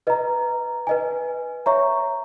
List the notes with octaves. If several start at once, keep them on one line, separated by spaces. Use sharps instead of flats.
B4 D#5 A#5
B4 D#5 G#5
C#5 E5 A#5 C#6